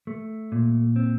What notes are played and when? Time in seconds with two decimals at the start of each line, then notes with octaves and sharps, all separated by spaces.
0.07 A3
0.52 A#2
0.96 C4